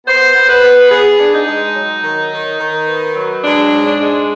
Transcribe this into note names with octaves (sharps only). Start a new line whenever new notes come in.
B3 C5
B3
B4
B3
B3 G#4
D4
D#4
G#3
F#3
D#3
D#3
D#3
B3
F#3
G#3 D4
G#2
D4
G#3